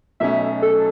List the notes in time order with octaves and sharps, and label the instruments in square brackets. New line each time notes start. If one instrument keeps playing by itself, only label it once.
[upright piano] B1 B2 A3 C#4 [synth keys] E5
[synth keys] A4